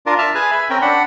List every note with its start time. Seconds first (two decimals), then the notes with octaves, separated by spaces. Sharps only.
0.06 D4 F4 A#4
0.18 E5 A5 F6
0.35 G#4 B4 G#5
0.51 E5 B5
0.70 C4 C#4 A#4 G5
0.82 D4 F#5 B5